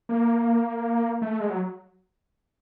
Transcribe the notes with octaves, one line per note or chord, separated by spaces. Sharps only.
A#3
A3
G#3
F#3